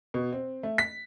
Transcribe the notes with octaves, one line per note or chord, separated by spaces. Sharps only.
B2
C4
A3
B6